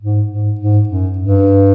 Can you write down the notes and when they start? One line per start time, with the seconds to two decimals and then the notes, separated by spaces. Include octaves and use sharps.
0.01 G#2
0.30 G#2
0.59 G#2
0.89 F#2
1.18 G2